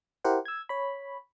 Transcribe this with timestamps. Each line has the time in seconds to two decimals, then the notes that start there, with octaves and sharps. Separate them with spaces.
0.24 E4 G4 A#4 C5 F#5
0.45 E6 G#6
0.69 C#5 B5